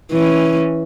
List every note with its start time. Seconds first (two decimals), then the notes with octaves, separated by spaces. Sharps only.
0.13 E3 C#4